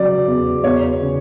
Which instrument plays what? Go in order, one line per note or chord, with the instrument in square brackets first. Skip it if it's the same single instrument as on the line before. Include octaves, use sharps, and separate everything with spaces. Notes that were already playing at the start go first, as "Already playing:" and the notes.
Already playing: [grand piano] C#3 F#3 [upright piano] D5
[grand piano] E2
[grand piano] E2 [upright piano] C#5
[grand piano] C#3